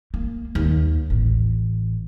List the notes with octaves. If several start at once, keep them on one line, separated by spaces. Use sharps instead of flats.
A#3
D#2
A1